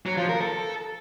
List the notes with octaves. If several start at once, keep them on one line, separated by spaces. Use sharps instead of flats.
F#3
F3
A#4
A4